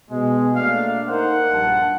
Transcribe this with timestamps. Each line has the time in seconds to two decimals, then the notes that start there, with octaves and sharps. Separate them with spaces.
0.10 B2 G#3
0.55 A3 A#3 D4 F5
1.08 D#4 A#4 C5 F#5
1.52 A#1 G2 A5